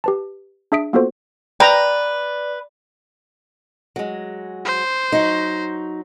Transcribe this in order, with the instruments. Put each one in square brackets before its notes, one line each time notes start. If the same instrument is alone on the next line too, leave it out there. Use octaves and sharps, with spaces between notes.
[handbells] G4 B4 A5
D4 G#4 E5 D#6 B6 D7
A#3 B3 F4 F#4 A4 C5
[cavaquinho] B4 [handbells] D5 [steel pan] G5 A#5
[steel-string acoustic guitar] F#3 G#3
[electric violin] C5
[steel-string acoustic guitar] F#3 D#4